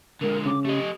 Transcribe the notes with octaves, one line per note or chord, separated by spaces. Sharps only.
D3 G#3 A#4
C#3 D6
A3 G4 D#5